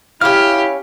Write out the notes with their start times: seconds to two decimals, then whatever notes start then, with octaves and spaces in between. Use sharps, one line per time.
0.21 C#4 E4 G4 F5 F6